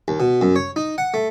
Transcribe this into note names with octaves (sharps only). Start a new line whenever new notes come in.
D#2
B2
F#2
C#5
D#4
F#5
A3